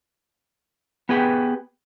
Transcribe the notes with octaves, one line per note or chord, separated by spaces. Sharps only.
B3 G4 G#4 B4 G5